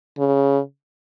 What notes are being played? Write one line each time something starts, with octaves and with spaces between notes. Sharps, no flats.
C#3